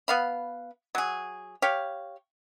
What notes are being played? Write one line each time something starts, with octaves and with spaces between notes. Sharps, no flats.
B3 F5 B5
F#3 G#4
G4 C#5 F5